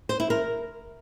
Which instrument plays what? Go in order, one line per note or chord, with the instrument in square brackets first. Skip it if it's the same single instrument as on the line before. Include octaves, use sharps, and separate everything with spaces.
[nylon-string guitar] C5
E4
A#4